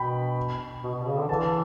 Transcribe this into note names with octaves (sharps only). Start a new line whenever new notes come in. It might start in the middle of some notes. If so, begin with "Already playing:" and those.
Already playing: B2 G5 B5
B2
B2
C#3
D3
E3 A5